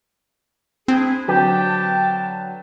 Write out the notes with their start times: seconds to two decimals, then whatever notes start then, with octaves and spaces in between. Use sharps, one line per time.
0.88 C4 D4 E4 G#4
1.28 D3 F#3 G4 B4 G5 A5